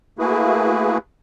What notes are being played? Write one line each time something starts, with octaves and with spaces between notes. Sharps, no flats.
A3 A#3 E4 F#4 G#4 B4